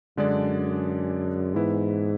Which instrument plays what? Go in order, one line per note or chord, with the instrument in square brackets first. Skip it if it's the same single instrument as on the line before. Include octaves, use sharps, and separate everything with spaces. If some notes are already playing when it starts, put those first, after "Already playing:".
[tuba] F#2 [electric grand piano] D3 G#3 D4 G#4 D5
[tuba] G#2 [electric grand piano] E3 B3 E4 B4